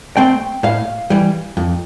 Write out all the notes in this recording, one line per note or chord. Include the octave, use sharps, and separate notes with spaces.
A3 C4 G5
A2 F5
E3 G3
F2